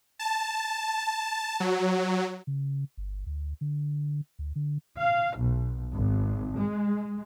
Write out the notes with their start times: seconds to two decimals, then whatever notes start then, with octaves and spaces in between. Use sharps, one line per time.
0.19 A5
1.60 F#3
2.47 C#3
2.97 G1
3.26 D2
3.61 D3
4.39 D2
4.56 D3
4.98 F5
5.38 B1
5.95 G#1
6.59 G#3